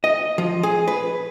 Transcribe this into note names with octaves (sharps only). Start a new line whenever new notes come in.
D#5
F3
G#4
B4